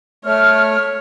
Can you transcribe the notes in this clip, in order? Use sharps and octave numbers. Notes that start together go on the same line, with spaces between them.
A3 C#5 F6